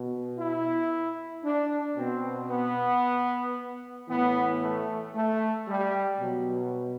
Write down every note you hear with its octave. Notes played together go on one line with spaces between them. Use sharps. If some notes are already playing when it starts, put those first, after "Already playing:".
Already playing: B2
E4
D4
B2 C4
B3
A2 E3 B3
A3
A3
G3
B2 F#3